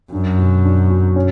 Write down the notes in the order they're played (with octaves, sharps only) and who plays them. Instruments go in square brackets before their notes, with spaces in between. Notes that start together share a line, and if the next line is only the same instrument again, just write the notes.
[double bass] F#2 [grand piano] D4
[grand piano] B2
D4
B2
C#4